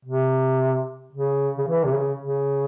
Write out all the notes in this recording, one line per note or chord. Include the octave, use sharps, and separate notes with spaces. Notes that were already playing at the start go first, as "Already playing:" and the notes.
C3
C#3
C#3
E3
C3
C#3
C#3